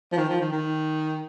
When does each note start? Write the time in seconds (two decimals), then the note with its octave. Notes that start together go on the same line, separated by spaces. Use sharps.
0.12 F3
0.17 D#3
0.29 F3
0.41 D#3
0.52 D#3